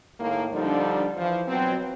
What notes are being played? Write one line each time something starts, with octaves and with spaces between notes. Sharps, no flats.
A2 D#3 G#3 A#3
D3 F3 G3 D4 D#4
E3 F3
B2 F#3 C4